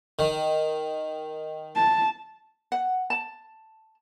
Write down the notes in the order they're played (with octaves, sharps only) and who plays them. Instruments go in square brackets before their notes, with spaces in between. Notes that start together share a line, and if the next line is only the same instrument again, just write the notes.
[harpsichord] D#3
[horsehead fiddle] A5
[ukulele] F#5
A5